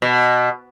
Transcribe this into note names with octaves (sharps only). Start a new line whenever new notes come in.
B2